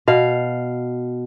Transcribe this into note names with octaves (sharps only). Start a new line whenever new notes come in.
B2 F5